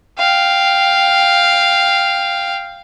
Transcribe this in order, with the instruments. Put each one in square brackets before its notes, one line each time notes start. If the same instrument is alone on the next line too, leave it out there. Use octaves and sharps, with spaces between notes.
[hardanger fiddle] F5 G5